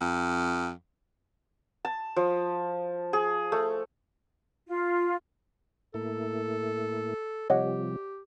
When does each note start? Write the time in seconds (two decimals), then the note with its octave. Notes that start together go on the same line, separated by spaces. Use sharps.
0.01 F2
1.85 A5
2.16 F3
3.13 G#4
3.52 A3
4.67 F4
5.94 A2 A#3 E4 A4
7.50 C3 F3 G3 G4 C#5 D#5 F#5